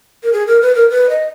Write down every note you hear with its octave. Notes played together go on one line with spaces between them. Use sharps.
A#4
G#4
A#4
B4
A#4
B4
D#5